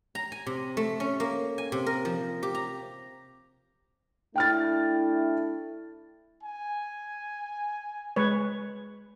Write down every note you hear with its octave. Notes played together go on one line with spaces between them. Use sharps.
A#5
G#5
C3
A3
C#4
A#3
G#5
C3
A#4
F3
G4
A#5
A3 D4 E4 G5 F6 A6
G#5
G#3 B4 C#5